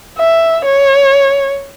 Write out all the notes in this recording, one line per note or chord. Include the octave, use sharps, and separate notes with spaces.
E5
C#5